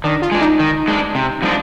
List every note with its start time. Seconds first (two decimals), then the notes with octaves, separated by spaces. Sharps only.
0.04 D#3 D4
0.22 F4
0.32 G#3 D4
0.41 D#4
0.59 D#3
0.88 G#3 D4
1.15 C3
1.42 F3 G#3 D4